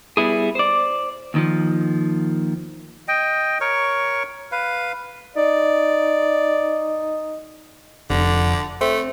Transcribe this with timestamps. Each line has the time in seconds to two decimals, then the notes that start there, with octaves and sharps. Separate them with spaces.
0.17 G3 B3 E4 G#4
0.55 C5 D5
1.34 D#2 D#3 F3
3.08 D#5 G5
3.61 A#4 C#5 C#6
4.52 B4 F5
5.36 D#4 D5
8.10 F1 D3
8.81 A3 C4